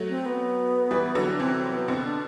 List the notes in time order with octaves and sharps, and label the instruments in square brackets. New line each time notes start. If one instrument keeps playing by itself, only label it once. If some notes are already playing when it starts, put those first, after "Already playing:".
Already playing: [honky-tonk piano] F#3 A3
[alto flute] C4
B3
[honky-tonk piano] E3 G3
D3 F#3
[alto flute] D4
[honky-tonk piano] C3 E3 [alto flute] C4
[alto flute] C4
B3
[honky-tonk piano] B2 D3 [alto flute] C4
[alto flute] D4